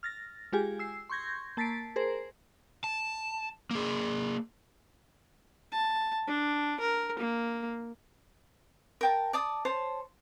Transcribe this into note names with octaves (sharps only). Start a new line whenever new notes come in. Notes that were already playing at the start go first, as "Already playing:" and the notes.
F6 A6 A#6
G#3 F4 G4 G#4 G#5
E6 C7
C6 C#6 G6 G#6 A#6
A#3 A5 A6 B6 C7 D7
G#4 A#4 C5
A5
A#3 G#4
A5
D4
A#4
A#3
A#4 G5 A5
D5 A5 D#6
C5 C#5 A5